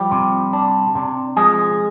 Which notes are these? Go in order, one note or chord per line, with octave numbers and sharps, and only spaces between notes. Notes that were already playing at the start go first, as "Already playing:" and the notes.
Already playing: F3 G3 G4
C3
D4
C3
F3 G#3 G#4